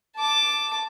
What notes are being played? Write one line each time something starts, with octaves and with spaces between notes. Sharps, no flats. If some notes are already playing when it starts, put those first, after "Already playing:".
A5 D6